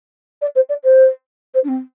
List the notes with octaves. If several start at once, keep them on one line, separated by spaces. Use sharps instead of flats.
D5
C5
D5
C5
C5
D4
C4